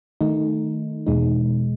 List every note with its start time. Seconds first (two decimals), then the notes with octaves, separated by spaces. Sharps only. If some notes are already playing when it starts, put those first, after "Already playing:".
0.21 D#3 A3 D#4
1.07 E2 B2 G#3 D#4